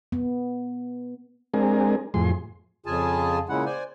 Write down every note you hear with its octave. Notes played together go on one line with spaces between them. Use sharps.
B3
G#3 C4 D4 G#4 A#4
F2 A2 G#4 C6
F2 C#3 F4 G#4 G#5 A5
A#2 C#3 G#3 C#4 E4 F#5
C5 D5 G#5